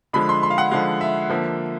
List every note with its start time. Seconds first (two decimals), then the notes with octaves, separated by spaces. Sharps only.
0.13 D3 F3 G#3 B5
0.29 C6
0.43 C6
0.50 F5
0.58 F#5
0.71 D3 F3 G#3 F5
1.01 E5
1.30 D3 F3 A#3